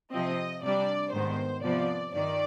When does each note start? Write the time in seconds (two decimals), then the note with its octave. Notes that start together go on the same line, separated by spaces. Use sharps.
0.12 C3 F3 C4 D#5
0.63 C3 G3 D4 D5
1.13 G#2 D#3 B3 C5
1.64 C3 F3 B3 D5
2.14 G2 D#3 D5